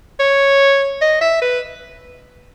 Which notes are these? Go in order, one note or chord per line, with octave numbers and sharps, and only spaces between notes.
C#5
D#5
E5
B4